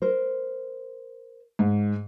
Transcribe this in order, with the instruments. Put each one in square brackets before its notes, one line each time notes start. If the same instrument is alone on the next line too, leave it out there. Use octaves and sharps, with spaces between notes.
[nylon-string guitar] A#4 C5
[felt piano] G#2